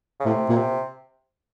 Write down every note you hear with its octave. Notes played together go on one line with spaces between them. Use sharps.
C#3
A2 C3
A#2
C3